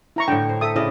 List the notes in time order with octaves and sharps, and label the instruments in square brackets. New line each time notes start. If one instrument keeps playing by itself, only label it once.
[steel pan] E4 A#5 C#6
[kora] A2 D3 [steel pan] G5
[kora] C5
[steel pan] A4 E5 D#6
[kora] C#3 D5 D#5 [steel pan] E4